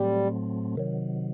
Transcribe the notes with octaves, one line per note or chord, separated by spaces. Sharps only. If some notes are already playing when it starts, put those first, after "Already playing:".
Already playing: A2 F#3 G3 A3 C4
C3 D#3 F#3